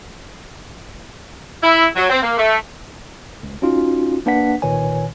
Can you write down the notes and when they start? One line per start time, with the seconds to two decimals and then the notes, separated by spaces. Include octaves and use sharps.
1.62 E4
1.96 F#3
2.10 C4
2.22 A#3
2.38 A3
3.43 C#2
3.62 C#4 D#4 F4 F#4
4.26 A#3 D4 B4 F#5 B6
4.62 C2 A#2 D#3 B4 C#5 G#5